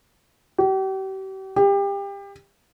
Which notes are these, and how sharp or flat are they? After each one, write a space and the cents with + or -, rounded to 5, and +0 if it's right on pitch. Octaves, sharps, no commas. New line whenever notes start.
G4 -40
G4 +25